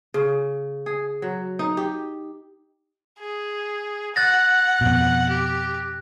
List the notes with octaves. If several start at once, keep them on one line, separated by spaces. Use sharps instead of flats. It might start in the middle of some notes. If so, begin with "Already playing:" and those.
C#3
G#4
F#3
D#4
G4
G#4
F#5 F#6 A6 A#6
F2 B2
G4